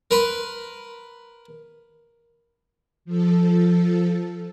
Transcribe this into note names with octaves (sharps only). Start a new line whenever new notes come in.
A#4 B4 C6
F3 A4